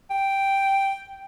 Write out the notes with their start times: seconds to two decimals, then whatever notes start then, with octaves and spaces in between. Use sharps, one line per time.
0.10 G5